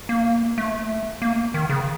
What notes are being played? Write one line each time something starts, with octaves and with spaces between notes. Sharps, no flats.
A#3
A3
A#3
D#3
C#3